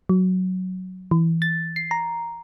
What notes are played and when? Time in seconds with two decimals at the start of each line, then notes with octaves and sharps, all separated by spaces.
0.09 F#3
1.11 E3
1.42 A6
1.76 C7
1.91 A#5